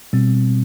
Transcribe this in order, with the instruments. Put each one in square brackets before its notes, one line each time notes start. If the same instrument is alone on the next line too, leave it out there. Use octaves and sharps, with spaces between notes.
[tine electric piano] B2 G3 C4